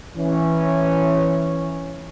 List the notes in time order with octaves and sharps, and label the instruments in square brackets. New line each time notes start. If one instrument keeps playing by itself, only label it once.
[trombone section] E3 C#4